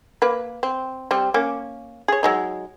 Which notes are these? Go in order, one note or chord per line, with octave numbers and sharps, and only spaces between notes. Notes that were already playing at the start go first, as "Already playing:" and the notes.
A#3 B4
C4
G3 C4
A#3 C#4
G#4 C#5
F#3 G#3 D#4